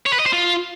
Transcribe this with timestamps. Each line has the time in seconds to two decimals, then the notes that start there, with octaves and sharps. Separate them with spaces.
0.06 C#5
0.13 B4
0.19 D#5
0.26 C5
0.33 F4